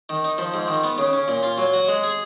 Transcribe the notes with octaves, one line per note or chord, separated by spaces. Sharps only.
D#3
D#4
F3
G#2
D#3
B3
C#3
C#4
A#2
F4
F#3
F#4
G#3
G#4